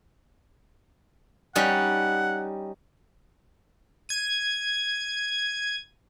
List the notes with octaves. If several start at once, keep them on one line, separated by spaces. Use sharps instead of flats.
G3 C#4 D#4 F#5
G#6 D#7